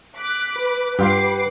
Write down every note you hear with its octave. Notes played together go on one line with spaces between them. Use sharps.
D6 F#6 B6
B4
G2 F4 G4 F#5 D6 C7